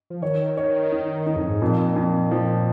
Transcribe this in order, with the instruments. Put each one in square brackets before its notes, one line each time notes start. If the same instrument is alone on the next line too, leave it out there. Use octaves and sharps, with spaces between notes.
[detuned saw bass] F3
[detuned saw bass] D#3 [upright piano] C#5
[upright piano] C#5
D#4
D#4
[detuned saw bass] F2
G#2
[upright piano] F2 [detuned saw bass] A#2
[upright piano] F2
F3